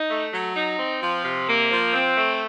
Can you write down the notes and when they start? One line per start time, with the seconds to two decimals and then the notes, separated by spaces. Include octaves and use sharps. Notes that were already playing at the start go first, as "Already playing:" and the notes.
Already playing: D#4
0.10 A3
0.33 F#3
0.55 D#4
0.79 C4
1.01 F3
1.24 C3
1.48 A#3
1.71 F3
1.93 C4
2.17 A3